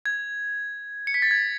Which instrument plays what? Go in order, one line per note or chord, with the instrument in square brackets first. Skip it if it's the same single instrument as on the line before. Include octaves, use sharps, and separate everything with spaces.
[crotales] G#6
C#7
B6
A6
G#6